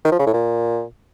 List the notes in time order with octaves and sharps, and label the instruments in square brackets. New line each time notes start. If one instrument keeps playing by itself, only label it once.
[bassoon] D#3
F3
C#3
A2
A#2